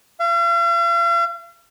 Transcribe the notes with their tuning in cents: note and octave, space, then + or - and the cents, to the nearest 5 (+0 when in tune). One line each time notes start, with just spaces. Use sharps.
F5 -45